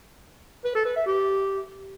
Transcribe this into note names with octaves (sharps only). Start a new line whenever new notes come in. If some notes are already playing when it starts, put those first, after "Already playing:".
B4
A4
B4
E5
G4